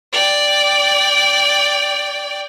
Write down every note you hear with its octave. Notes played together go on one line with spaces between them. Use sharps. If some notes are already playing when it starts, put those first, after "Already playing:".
D5 G5